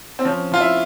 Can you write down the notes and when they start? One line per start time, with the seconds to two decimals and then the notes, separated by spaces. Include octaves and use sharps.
0.19 C4
0.25 F3 C#4
0.52 F3 F4
0.60 E4